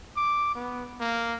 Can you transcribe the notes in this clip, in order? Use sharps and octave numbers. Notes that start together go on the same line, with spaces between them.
D6
B3
A#3